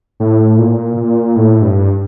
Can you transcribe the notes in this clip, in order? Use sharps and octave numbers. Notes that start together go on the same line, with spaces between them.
A2
A#2
A#2
A2
G2